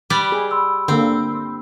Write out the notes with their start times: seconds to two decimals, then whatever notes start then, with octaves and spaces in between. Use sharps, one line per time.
0.10 G3 B4 D5
0.32 G#4
0.51 B5 C6 E6
0.88 D3 A#3 C4